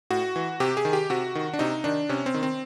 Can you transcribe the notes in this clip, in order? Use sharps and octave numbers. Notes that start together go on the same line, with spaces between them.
A2 F#4
E3
C3 G4
G#4
D#3
G4
C3 F#4
D#3
D4
C3 D#4
D#3 D4
C3 C#4
C4
D#3
C4